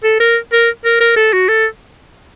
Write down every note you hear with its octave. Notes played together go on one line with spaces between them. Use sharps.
A4
A#4
A#4
A#4
A#4
A4
F#4
A4